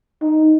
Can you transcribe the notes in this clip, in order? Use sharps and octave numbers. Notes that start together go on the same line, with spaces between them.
D#4